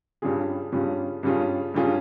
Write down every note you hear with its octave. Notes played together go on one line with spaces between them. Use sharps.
G2 G3 C#4 F4 G#4
G2 G3 C#4 F4 G#4
G2 G3 C#4 F4 G#4
G2 G3 C#4 F4 G#4